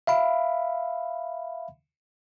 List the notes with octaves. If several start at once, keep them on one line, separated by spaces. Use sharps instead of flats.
E5 F5 B5